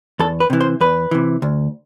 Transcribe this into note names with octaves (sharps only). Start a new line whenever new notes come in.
E2 A4
B4
C3 E3
C5
E2 B4
C3 E3
D2